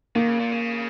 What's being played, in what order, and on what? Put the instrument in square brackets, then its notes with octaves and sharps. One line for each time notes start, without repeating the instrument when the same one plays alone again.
[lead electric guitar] D#3 [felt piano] A#3
[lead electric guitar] C#3
A#2
C#3